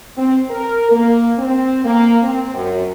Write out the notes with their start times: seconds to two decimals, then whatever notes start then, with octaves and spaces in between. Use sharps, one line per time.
0.17 C4
0.49 A#4
0.91 A#3
1.38 C4
1.84 A#3
2.23 C4
2.54 F#2